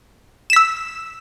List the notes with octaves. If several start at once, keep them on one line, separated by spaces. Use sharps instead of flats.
E6 B6 E7